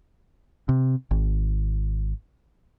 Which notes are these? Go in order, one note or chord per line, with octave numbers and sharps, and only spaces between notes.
C3
G#1